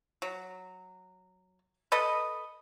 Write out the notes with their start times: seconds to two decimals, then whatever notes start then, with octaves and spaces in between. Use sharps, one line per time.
0.22 F#3
1.92 A4 B4 D#5